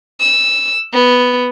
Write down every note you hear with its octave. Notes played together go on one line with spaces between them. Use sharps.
E6
B3